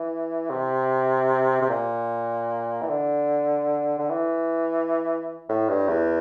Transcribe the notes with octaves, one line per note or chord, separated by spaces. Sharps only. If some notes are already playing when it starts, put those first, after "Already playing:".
Already playing: E3
C3
C3
A#2
E3
D3
D3
E3
A2
G2
E2